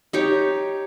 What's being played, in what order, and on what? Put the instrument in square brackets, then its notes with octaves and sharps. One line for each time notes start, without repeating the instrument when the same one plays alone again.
[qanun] D#4 G4 C#5